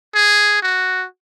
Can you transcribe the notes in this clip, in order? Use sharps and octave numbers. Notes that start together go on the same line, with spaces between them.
G#4
F#4